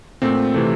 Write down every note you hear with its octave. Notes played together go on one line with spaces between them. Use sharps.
A#2 A3 C4
C3 E3 A3